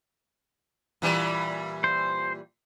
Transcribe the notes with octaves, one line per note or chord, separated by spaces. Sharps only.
A#2 E3 G3
C5